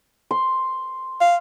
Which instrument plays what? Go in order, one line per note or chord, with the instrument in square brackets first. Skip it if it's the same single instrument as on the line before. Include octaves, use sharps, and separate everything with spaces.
[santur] C6
[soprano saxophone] F5